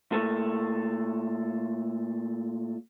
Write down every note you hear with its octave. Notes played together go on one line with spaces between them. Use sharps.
A#2 A3